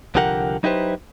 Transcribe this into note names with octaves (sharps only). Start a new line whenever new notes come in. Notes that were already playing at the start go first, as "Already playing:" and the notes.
C2 D3 F3 G4 A#4 F#5
F#3 D#4 E4 G4 B4 C5